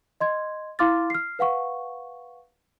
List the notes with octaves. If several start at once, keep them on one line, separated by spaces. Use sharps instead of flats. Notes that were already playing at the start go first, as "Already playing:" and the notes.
D#5 C6 G#6
E4 F5 C6 D6 F6 A6
F6 C7
B4 F5 F#5 C#6